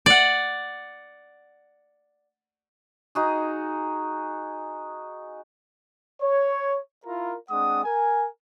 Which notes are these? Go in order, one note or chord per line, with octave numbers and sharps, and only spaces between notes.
D5 F#5
D#4 F#4 G#4
C#5
E4 F4 A#4
G#3 C4 D4 F#5 D#6
A#4 G#5